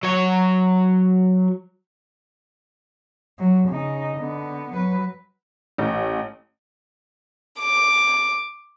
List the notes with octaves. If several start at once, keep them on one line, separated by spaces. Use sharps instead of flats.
F#3 C#5
F#3
C#3 D#4
D3 B3
F#3 B4
A1
D6